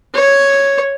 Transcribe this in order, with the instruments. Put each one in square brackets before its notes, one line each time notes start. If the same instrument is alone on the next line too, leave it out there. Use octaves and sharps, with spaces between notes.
[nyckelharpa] C#5